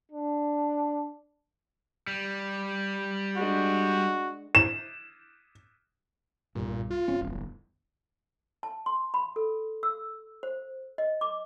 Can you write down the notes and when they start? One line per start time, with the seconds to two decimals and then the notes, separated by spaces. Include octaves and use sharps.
0.11 D4
2.07 G3
3.37 G#3 D4 F#4
4.55 E7
6.55 B1 G2 A#2
6.90 F4
7.08 F1 C4 C#4
7.21 D1 G1 E2
8.63 A5
8.86 C6
9.14 B5
9.36 A4
9.83 E6
10.43 C5
10.98 D#5
11.21 D6